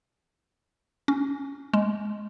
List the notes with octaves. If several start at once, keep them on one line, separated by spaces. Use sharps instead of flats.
C#4
G#3